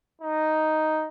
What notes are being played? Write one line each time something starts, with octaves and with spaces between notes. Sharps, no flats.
D#4